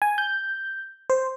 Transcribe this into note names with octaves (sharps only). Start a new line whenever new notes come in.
G#5
G6
C5